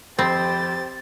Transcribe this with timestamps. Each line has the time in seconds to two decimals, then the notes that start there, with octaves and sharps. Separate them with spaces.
0.19 F2 C4 G4 C5 B5 A6